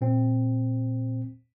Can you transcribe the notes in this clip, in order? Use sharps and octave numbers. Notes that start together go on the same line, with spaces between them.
A#2 C4